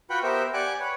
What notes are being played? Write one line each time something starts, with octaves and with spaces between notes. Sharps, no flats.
F4 F#4 B4 F#5 G5 B5
B3 G4 A#4 C5 E5
G4 D5 F#5 G#5 D6 F#6
B4 C#5